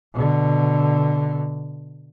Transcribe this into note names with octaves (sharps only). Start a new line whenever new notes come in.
B2 D3